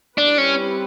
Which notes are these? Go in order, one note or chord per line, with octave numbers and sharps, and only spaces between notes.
G3 C4 D4 E4 G4 B4
C#4